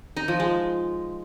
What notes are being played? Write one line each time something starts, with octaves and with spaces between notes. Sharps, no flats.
D#4
F3
G#3